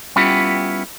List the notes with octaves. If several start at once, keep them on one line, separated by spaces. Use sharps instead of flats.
G3 B3 C#4 E4 F4 G4